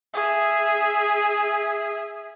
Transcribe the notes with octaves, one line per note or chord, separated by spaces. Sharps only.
G#4 E5